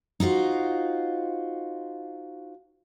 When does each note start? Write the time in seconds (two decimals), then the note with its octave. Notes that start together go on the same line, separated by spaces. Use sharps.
0.20 D#4 F4 F#4 C5